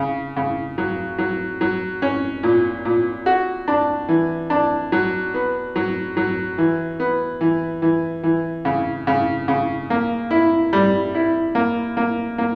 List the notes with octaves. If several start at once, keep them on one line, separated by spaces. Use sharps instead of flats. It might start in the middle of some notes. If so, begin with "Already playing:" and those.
Already playing: C#3
C#3
F#3
F#3
F#3
C#4
A#2
A#2
F#4
D4
E3
D4
F#3
B3
F#3
F#3
E3
B3
E3
E3
E3
C#3
C#3
C#3
A#3
E4
G3
E4
A#3
A#3
A#3